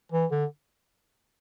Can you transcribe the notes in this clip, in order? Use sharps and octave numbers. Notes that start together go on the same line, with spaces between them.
E3
D3